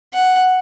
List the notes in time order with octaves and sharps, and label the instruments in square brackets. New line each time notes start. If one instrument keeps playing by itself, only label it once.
[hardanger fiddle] F#5